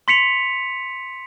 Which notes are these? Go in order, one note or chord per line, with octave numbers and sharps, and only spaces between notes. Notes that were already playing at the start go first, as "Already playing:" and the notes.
C6 B6 C#7 F7